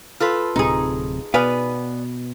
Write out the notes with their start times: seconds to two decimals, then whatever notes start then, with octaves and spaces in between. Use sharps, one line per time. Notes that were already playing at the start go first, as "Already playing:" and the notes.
0.20 F4 A4 B4
0.56 D1 C3 D#4 G#4
1.34 B2 B3 B4 D5 F5 G#5